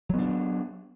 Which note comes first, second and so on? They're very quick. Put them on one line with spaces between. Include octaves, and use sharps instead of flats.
F#3 B3 D4